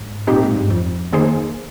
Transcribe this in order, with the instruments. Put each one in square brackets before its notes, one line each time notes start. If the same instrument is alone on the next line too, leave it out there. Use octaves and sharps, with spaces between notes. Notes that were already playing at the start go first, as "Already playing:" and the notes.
Already playing: [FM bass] G#2
[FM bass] A#2 [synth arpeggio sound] C4 D#4 G4
[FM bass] G#2
G2
F2
[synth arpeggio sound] D#3 A#3 D#4 G#4 C5